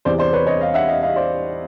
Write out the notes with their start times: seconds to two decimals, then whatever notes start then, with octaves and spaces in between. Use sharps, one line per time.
0.05 E2 C3 E3 C5 D5
0.19 C5 D5
0.33 B4 C#5
0.47 C#5 D#5
0.61 D#5 F5
0.74 E5 F#5
0.88 D#5 F5
1.02 D#5 F5
1.16 C5 D5